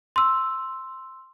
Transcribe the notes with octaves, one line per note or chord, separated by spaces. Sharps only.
C6 E6